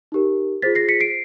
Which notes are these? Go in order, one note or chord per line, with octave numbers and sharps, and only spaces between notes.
D#4 G4 A#4
F4 G#4 C5 A6 B6
A#6 C7
B6 C#7
C7 D7